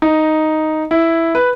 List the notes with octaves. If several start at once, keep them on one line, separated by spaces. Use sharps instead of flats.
D#4
E4
B4